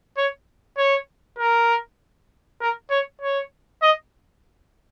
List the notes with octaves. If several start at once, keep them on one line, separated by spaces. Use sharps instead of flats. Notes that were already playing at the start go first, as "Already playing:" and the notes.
C#5
C#5
A#4
A#4
C#5
C#5
D#5